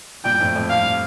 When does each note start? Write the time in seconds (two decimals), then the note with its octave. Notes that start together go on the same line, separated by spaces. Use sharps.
0.25 G2 A#2 G5
0.40 F2 A2
0.56 F2
0.70 G2 F5